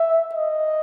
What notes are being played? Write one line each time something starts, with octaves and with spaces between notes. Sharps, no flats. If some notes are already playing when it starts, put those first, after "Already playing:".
Already playing: E5
D#5